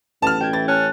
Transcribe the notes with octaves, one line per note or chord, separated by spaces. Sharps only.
A1 B3 A5 F6
B2 G5 G#6
E3 A6
C#4 A5 F#6